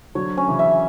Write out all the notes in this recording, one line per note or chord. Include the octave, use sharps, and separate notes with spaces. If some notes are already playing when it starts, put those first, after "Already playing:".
D3 F#3 C#5
C#4
C#3 E3
E5